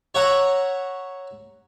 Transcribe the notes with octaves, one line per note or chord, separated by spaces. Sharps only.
C#5 E5 F#5 A#5